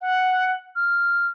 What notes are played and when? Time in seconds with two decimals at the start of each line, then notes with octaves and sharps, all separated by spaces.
0.01 F#5
0.75 F6